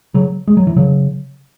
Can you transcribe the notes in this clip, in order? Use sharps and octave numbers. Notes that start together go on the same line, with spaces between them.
C#3 F#3
G#3
F#3
E3
C#3 F#3